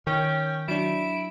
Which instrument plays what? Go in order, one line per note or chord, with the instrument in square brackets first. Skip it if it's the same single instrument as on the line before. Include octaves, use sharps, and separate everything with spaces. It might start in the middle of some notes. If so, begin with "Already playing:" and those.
[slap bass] D#3 [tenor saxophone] C#4 [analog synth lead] G5
[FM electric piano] F#3 D4 [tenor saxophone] E4 [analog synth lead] D7